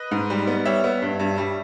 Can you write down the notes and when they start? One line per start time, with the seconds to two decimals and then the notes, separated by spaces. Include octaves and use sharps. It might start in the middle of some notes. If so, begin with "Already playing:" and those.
Already playing: B4 D#5
0.11 G#2
0.30 G3
0.47 B3
0.65 G3 C#5 E5
0.84 B3
1.02 G2
1.20 G2
1.38 G3